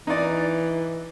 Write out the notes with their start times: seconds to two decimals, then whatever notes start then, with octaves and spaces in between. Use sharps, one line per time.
0.07 E3 D#4 D5